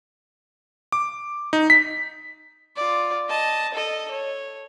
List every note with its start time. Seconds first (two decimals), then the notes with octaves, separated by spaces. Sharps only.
0.92 D6
1.53 D#4
1.70 B6
2.76 F4 D5
3.29 D#5 A5
3.74 A4 D#5
4.11 C#5